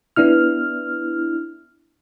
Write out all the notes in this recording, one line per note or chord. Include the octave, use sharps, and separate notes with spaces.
B3 D4 E4 F6